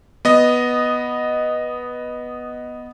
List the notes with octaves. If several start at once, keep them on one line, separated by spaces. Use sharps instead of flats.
B3 D#5